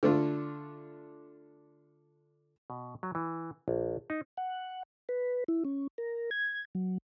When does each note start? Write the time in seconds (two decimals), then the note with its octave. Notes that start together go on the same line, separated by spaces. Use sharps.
0.03 D3 A3 D4 F4
2.70 B2
3.03 F#3
3.15 E3
3.68 A#1
4.10 D#4
4.37 F#5
5.09 B4
5.48 E4
5.65 C#4
5.98 A#4
6.31 G#6
6.75 F#3